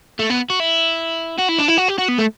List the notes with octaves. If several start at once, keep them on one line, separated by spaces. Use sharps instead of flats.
A3
B3
F#4
E4
F#4
E4
D4
E4
F#4
G4
F#4
B3
A3